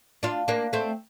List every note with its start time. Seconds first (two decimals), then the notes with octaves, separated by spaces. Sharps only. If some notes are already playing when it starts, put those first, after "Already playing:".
0.23 D4 F4
0.48 A#3 D4
0.73 A3 C4